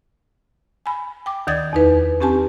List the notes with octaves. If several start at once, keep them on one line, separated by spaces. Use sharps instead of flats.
G#5 B5
G5 D6
D2 D#3 D5 D#6 G#6 A6
E2 D#4 B4
C4 C#4 G4 G#5 A5